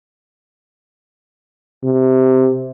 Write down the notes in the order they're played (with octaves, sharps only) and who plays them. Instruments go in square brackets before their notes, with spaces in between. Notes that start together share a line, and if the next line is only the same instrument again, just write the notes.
[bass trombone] C3